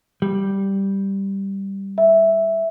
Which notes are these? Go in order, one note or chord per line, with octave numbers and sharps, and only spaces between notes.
G3
E5